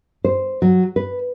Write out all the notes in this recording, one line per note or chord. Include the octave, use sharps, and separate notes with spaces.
C5
F#3
B4